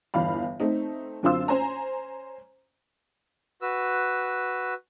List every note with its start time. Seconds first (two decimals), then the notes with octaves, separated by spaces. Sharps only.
0.14 G1 E2 F5 B5
0.60 A3 C4 D#4
1.23 F#2 D3 C4 F4 C6 E6
1.48 C#4 C5 G#5 A#5
3.62 F#4 B4 E6